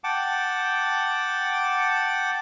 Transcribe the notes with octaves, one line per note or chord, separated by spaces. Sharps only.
F#5 G5 A5 D6